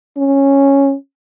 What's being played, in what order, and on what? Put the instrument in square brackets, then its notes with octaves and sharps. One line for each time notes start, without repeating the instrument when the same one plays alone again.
[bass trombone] C#4